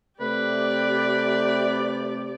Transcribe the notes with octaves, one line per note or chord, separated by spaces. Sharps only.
C3 A3 G4 B4 D5